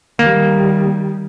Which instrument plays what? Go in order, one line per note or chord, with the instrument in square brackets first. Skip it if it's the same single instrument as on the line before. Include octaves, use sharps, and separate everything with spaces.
[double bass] D#3 G3 [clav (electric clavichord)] A#3